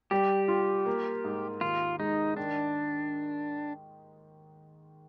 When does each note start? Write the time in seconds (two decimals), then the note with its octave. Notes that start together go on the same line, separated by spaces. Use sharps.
0.11 G3 G4
0.48 F4
0.86 A#3
1.24 G#2
1.61 D#2 F4
2.00 G#3 D#4
2.37 D#3 D4